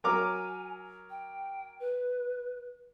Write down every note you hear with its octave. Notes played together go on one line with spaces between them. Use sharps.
F#3 A#4 G#5 D6
G5
B4